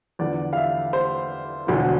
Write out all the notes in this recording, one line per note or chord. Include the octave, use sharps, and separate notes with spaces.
E2 D3 F3 D5
F5
E5
C5
E1 D2 D3 F3